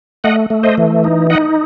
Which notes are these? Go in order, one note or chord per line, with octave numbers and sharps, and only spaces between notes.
A3 D#5 F#5
A3
C5 D#5
E3
D#4
D#4 D#5 F#5